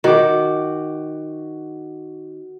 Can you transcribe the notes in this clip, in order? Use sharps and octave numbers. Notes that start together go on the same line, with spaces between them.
D#3 F#4 D6